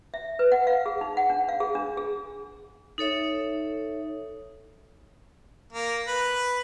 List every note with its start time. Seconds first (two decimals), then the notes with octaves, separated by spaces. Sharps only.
0.14 E5
0.39 B4
0.52 F#5
0.67 F5
0.86 G#4
1.01 D#4
1.17 F#5
1.30 D4
1.49 F5
1.60 G#4
1.75 D4
1.97 G#4
2.98 D#4 A4 C#5 E5
5.72 A#3
6.07 B4